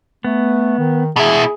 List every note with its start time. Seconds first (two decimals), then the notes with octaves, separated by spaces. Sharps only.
0.25 A3 B3
0.79 D#3
1.16 B2 E4 G#4